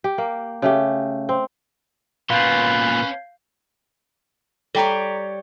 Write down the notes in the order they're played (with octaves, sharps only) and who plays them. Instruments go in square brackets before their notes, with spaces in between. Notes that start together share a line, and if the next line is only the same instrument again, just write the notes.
[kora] G4
A#3
C#3 A3 G4
C4
[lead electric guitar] A#2 B3 [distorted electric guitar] C#4 C6 [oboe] B4 [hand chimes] F5 G6 C7
[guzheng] G3 G4 C#5 [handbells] A4 G5 A#5